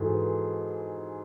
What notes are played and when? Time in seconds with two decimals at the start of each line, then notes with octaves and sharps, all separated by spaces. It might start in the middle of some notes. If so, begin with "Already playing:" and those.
Already playing: G#2 E3 F#4 G#4 A4
0.13 B4